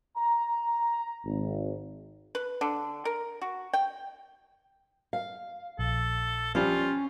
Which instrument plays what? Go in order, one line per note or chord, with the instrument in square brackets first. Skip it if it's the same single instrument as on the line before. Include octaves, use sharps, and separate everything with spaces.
[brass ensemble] A#5
G#1
[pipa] B4
D3
A#4
F#4
G5
[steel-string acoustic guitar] F5
[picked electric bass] A#1 [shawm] A4
[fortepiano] F3 G3 [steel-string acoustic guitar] C#4 [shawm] F4